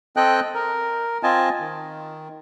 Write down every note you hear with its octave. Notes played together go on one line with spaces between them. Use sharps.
C4 A4 D#5 G5 F#6
A#4
C4 F4 D#5 G#5 A5
D#3